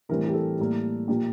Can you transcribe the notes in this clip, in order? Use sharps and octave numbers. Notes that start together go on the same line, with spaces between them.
A2 E3 G3 C4 A#4
G4
A4
A2 G3 A#3
A#2 F3 A#3 G4